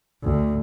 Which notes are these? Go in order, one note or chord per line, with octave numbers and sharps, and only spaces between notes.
D2